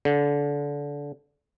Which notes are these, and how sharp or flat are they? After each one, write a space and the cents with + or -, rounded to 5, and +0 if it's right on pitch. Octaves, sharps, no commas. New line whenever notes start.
D3 -25